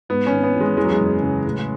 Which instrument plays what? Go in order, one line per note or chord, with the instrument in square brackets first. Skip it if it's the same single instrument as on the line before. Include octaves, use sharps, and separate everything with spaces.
[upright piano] G#2 [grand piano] B3
[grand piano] C#4
[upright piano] G#1
[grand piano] B3
[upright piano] E3
[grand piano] G#3
[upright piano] E2 [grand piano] G#3
[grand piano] F#3
G#3
[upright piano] F#1
C#3
A2